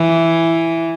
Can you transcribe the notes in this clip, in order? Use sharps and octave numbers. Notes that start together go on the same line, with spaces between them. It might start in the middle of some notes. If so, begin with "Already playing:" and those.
Already playing: E3